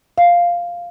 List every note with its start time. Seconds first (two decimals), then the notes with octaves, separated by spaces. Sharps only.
0.18 F5